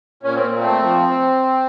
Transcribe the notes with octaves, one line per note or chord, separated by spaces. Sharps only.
A#2 C#4
C4
A#2
A3 C4
F3